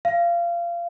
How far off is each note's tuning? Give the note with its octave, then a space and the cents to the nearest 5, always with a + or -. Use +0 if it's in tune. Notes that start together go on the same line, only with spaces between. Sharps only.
F5 -25